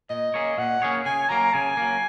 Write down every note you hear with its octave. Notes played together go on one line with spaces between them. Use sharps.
A#2 D#5
A#3 C#4 G#4 C#5
A#2 F#5
A#3 C#4 G#4 C#5
C#3 G#5
F#3 A#3 A#5
C#3 G#5
F#3 A#3